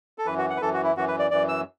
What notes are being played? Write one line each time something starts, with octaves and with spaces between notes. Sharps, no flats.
A4
F#2 E3 B4
F#4
F#5
B4
F#2 E3 A4
F#4
E4
F#2 E3 F#4
B4
D5
F#2 E3 D5
E6